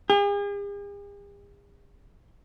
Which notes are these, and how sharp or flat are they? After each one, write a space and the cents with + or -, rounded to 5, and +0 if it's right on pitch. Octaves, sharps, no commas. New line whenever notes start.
G#4 -45